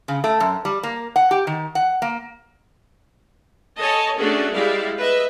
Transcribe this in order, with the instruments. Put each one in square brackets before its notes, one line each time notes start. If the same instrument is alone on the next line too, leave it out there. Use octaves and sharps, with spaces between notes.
[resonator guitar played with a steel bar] C#3
A3
F#2
G3
A#3
F#5
G4
D#3
F#5
A#3
[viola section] A4 C#5 D#5 G#5 A5
A3 C#4 D4 F#4 G#4 A4
G3 G#3 E4 D5 E5 F5
B4 D#5 E5